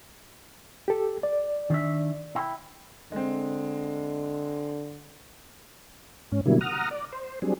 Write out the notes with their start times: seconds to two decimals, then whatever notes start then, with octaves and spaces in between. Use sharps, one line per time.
0.88 G4 A4
1.23 D5
1.70 D#3 D4 E5
2.35 E4 G5
3.12 D3 G#3 C4
6.32 G#2 C#4
6.46 B2 D3 F#3 G3 A#3 E4
6.61 F#5 A#5 D#6 F6
6.91 D5
7.13 C5
7.42 F#3 G3 C4 D4 G#4